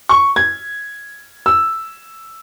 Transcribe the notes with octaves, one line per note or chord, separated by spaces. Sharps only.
C#6
G#6
E6